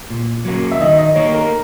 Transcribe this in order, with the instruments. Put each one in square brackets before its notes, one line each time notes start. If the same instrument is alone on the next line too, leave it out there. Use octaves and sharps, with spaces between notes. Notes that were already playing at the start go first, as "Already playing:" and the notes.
[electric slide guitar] A#2
F#3 A#3 C#4
[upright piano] E5
[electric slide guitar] D#3 [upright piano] D#5
[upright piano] D#5
[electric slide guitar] A#3 D#4 [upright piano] C#5
[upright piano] A#4